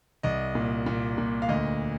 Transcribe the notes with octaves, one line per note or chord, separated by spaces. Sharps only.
C2 D#5
A#2
A#2
A#2
F5
D2 D#5